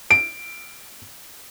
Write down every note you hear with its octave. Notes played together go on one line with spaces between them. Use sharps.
D7